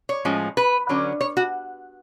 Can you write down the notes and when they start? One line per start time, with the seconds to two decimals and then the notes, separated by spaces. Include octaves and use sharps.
0.09 C#5
0.25 A2 F3 G#3 C#4
0.57 B4
0.89 D3 F#3 C#4
1.21 C#5
1.37 F#4